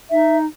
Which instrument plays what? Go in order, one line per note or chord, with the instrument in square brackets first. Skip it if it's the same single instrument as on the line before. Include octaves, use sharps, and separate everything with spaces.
[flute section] D#4 E5